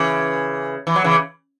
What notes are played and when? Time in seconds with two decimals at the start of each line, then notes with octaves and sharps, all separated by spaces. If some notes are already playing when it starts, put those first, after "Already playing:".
Already playing: C#3 E3
0.87 E3
0.96 F#3
1.04 C#3 E3